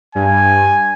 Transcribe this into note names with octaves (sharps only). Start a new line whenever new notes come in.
G2 G#5